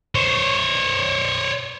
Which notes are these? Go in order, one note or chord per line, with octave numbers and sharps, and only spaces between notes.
C5 C#5